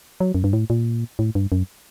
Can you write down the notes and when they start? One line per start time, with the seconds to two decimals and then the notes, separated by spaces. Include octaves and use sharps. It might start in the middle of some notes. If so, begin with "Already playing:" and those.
0.20 F#3
0.35 F#2
0.44 G2
0.53 A2
0.70 A#2
1.19 A2
1.35 G2
1.52 F#2